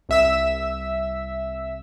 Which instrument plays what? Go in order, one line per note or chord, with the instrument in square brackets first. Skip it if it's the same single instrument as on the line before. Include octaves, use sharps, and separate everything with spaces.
[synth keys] C2 E5 E6